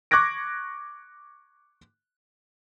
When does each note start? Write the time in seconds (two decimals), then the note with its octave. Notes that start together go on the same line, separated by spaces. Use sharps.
0.11 C#6 D6 F#6 G#6 A#6 D7